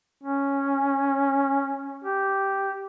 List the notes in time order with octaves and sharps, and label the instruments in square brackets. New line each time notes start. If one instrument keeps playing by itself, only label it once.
[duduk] C#4
G4